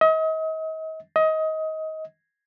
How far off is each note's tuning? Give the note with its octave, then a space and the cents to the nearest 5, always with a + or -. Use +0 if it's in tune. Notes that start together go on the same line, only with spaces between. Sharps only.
D#5 +40
D#5 +25